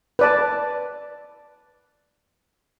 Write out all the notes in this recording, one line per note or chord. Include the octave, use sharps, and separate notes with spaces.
B4 D5 A5